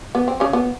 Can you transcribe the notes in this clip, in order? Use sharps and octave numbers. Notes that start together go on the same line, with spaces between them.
B3
C4
C#3 C#4
B3